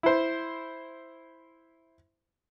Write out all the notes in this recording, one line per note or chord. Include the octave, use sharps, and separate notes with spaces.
E4 C5